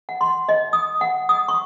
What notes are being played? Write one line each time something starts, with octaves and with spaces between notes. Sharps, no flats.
F#5
C6
D#5
D#6
F#5
D#6
C#6